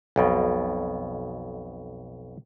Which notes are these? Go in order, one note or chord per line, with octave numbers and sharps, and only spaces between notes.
B1 F2 B2